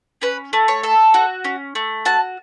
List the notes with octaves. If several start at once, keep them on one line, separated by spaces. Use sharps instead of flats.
C#4 B4
A3
C#5
A4
F#4
C#4
A3
F#4 A5